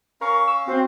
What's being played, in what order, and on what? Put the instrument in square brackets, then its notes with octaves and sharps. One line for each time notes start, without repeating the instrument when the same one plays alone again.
[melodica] C#4 F5 [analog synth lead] A#4 [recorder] C#6
[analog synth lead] E6
[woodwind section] C4 [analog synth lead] F#4 [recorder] C5